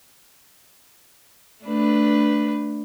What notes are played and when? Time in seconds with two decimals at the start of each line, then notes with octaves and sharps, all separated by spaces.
1.65 A3 D4 B4